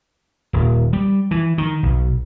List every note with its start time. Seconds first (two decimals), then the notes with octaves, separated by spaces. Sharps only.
0.53 D#1
0.93 G3
1.31 E3
1.58 D#3
1.83 B1